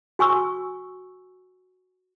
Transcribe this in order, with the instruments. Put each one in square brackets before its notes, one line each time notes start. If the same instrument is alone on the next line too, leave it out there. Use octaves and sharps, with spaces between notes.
[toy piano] F#4 G#5 C#6 E6